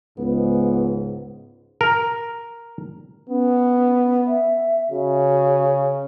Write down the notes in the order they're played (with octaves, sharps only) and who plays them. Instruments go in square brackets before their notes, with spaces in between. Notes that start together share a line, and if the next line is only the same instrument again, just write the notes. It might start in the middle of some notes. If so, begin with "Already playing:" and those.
[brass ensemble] C#2 G#2 [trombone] B3
[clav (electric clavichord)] A#4
[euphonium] B3 [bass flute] C#4
[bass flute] E5
[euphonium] C#3 [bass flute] F#4